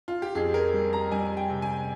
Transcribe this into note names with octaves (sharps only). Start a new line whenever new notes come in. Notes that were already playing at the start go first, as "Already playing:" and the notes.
F4
G4
F2 G#4
A#4
G3
A#5
G3 G#5
G5
C3
G#5